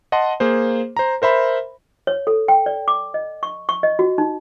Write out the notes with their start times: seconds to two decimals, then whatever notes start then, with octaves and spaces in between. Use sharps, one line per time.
0.12 D#5 F#5 A5 C6
0.40 A#3 G#4 C5
0.97 C5 A#5
1.22 A#4 C5 E5 B5
2.07 C#5
2.27 A4
2.48 G5
2.66 D5
2.88 D6
3.14 D#5
3.43 C#6
3.69 C#6
3.83 D#5
3.99 F#4
4.18 D#4